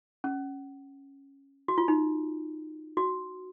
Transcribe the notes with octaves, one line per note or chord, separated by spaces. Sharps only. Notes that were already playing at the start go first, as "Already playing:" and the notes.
C#4
F#4
F4
D#4
F#4